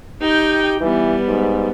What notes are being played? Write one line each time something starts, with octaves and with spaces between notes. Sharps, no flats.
D#4 G4 G5
E3 G3 B3
G#2